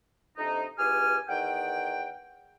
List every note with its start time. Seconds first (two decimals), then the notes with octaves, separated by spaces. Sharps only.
0.37 F2 C3 D4 D#4
0.78 C#2 E3 G4 G#5 D#6 F6
1.28 E2 D#3 F#5 G5